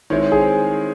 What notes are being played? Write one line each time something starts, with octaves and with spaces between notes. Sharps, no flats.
D#3 G#3 C4 E4 C#5
C5
G#4